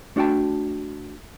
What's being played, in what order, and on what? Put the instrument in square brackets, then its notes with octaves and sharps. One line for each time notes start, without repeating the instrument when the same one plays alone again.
[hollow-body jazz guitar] A3 D4 F#4 F#5 G5 A5